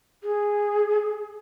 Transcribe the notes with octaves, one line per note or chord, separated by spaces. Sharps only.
G#4